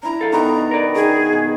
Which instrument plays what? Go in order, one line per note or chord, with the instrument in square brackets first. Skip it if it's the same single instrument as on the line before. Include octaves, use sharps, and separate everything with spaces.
[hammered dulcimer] D4 E4 [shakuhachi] A#5
[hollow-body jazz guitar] A4 F5
[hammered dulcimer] B2 D#3 B3 [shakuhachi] A#5
[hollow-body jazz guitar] A#4 D5
[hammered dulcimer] D#3 [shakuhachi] G#4
[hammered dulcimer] B2